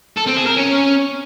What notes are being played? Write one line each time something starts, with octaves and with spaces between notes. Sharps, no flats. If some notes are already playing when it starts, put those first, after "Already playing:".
A4
C4
G#4
A#4
C#4